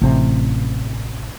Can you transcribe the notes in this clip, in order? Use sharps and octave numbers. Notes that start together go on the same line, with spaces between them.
A1 C3